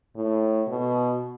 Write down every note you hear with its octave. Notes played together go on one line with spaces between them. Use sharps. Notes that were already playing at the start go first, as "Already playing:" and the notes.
A2
B2